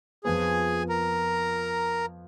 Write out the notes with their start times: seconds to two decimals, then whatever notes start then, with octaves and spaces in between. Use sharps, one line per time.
0.24 F2 F3 B3 G#4 G#5
0.89 A#4 A#5